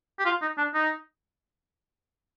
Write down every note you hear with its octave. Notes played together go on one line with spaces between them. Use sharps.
G4
F4
D#4
D4
D#4